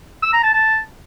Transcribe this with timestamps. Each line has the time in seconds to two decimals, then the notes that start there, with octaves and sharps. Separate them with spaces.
0.22 E6
0.33 A#5
0.43 A5
0.53 A5